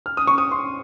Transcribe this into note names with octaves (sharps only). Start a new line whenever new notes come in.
F6
D#6
C#6
D#6
C6